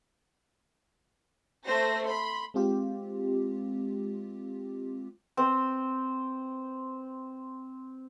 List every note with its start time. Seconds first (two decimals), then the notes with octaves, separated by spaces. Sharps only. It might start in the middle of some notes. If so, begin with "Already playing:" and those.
1.65 A3 C5 A#6
2.03 B5 C6
2.54 G#3 C4 F4 G4
5.37 C4 G5